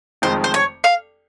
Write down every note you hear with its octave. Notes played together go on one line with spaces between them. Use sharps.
F1 F2 D#3 G#3 C5
C5
C#5
F5